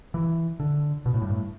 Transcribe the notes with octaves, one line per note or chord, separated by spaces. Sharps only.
E3
D3
B2
A2
G2
A2